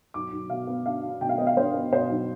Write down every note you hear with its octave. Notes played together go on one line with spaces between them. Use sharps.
B1 D6
B1
B2 F5
B3
D4 F5
D4
B2 G5
F5
B3 D#5
F5
D4 C5
B3
B2 C5
B1